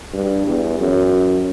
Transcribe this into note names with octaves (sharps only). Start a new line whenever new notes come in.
G2
E2
F#2